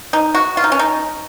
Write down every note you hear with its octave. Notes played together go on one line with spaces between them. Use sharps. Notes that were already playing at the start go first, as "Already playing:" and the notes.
D#4
F#4
F4
D#4
C#4
D#4